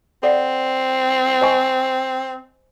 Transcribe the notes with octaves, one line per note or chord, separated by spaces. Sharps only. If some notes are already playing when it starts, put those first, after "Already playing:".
C4 A4 D5 F#5
C5 D#5 G#5 C#6